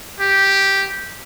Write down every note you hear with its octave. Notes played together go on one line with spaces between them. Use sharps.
G4